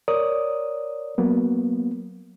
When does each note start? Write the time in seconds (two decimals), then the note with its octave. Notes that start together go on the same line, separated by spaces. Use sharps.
0.08 A#4 C#5 D5 D#6
1.18 F#3 A#3 B3